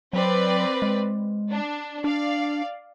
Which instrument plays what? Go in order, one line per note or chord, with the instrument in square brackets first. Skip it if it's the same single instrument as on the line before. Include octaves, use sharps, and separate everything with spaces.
[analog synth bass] F#3 [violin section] C4 B4 D5
[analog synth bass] G#3
[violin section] D4
[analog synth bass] D4 [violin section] D5 F5